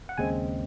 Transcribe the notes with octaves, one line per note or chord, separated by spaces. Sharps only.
F#5
D#2 C#3 G#3 C4 G#5